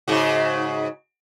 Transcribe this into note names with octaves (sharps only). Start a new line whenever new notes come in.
G#2 C#3 F#4